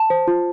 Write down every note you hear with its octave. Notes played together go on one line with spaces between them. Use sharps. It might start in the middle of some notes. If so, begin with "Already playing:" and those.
Already playing: A5
C5
F4